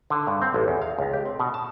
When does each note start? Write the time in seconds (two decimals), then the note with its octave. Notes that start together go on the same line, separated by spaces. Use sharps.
0.10 D3
0.27 G2
0.42 C4
0.54 A1
0.68 E2
0.82 F5
0.99 C#2
1.13 G4
1.25 C4
1.40 B2
1.54 A5